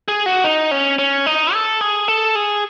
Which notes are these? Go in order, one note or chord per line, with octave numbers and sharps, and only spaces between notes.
G#4
F#4
D#4
C#4
C#4
D#4
A4
G#4
A4
G#4